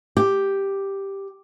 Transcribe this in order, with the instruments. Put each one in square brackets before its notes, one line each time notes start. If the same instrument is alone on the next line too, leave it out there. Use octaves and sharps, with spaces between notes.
[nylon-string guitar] G4